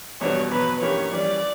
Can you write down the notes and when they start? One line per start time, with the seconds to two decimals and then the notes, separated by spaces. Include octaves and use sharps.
0.21 E2 B2 G3 B3 F#4 C#5
0.51 E2 B2 F#3 B4
0.81 G2 E3 A#3 C#4 G4 C#5
1.11 E3 G3 C#4 D5